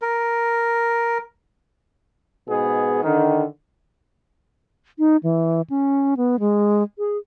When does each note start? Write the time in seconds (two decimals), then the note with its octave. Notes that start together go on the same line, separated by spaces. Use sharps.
0.02 A#4
2.48 G#2 B2 B3 G#4
3.03 D3 D#3
4.99 D#4
5.23 E3
5.70 C#4
6.17 B3
6.40 G#3
6.98 G#4